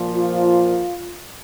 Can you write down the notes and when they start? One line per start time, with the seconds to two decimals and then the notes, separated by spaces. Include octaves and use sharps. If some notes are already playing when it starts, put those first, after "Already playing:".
Already playing: A#2 F3
0.11 F4